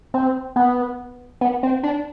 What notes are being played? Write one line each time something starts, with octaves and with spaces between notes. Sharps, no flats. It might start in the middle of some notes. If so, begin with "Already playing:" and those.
C4
B3
B3
C4
D4